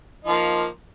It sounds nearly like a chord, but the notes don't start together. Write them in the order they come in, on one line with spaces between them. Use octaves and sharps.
D#4 F3 A#3